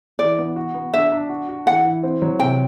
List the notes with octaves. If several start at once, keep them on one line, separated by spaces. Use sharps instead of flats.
E3 D5
B3
F#4
B3
D4 E5
D4
F#4
F#4
E3 F#5
E3
C4
F#3
C3 G5